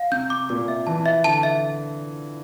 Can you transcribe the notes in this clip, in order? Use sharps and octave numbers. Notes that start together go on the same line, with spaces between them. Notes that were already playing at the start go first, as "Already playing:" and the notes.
Already playing: F5
C3 G6
D6
A#2 D6
E5
E3 A5
E5
D3 A5
E5